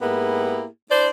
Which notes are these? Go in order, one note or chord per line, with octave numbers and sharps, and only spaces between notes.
G#2 A#3 B3 E4 G4 G#4
D4 E4 C5 D5